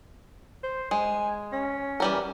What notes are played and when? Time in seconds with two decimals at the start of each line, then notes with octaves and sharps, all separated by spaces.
0.63 C5
0.91 G#3 G#5
1.52 C#4
2.00 E3 G3 A#4